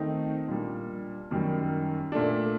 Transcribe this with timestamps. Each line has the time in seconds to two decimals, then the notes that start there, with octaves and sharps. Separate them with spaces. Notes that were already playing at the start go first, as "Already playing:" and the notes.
Already playing: D#3 A3 C4 D#4
0.48 A#2 G3 D4
1.31 F#2 D#3 G3
2.12 A#2 A3 D4